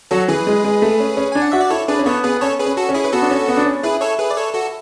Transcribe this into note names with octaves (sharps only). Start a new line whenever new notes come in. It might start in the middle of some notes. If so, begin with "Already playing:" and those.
F#3 F#4 A4
E3 G#4 B4
G#3
G#3
A3
C#4
C#4
D4 G#5
F#5
F#4 E5
D5
E4 A4 C#5
D4 G#4 B4
C#4
B3 A4 C#5
B3 G#4 B4
C#4 A4 C#5
G#4 B4
C#4
F#4 A4
C#4
E4 G#4
B4
B3 F#4 A4
D4
C#4
B3
D4
C#4
E4 G#4 B4
A4 C#5
G#4 B4
D5
A4 C#5
F#4 A4